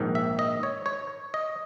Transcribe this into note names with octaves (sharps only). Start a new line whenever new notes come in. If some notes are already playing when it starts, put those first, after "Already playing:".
Already playing: A#1 G#2 D#3
E5
D#5
C#5
C#5
D#5